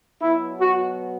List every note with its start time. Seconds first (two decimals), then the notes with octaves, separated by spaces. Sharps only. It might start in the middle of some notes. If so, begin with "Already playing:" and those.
0.21 B2 F#3 B3 E4
0.61 F#4